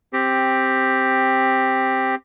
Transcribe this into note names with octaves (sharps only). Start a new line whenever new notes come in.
C4 G4